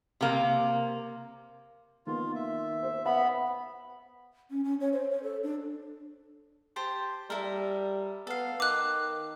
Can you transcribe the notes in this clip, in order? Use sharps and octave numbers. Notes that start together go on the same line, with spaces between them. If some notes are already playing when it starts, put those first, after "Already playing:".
C3 A#3
D#3 A#3 B3 F4
E5
C5
B3 E5 B5
C#4
C#4
C#5
C5
C#5
A4
D4
G4 C5 A5
G3 E4 A4 A#4
B3 A4 F5
D#3 D6 F#6